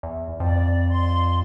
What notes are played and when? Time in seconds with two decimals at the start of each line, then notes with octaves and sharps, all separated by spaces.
0.03 E2
0.40 F2 D5
0.90 C6